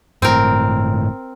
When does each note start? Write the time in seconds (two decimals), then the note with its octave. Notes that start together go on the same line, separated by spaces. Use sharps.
0.22 G1 A2 C4 A#4